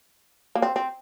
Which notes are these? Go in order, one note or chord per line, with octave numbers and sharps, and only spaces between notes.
A#3
C4
C4